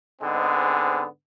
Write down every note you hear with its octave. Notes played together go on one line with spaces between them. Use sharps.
G#2 D3 G#3 B3 C4